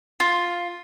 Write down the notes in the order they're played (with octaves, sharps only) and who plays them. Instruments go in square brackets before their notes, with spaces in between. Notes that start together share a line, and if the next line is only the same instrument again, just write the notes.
[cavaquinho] F4